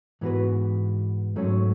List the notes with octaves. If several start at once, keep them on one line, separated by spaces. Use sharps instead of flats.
G#2 E3 B3 F#4 B4
G#2 F#3 A3 C#4